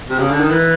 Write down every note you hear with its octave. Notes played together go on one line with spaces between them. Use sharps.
C3
C#3
D3
D#3
E3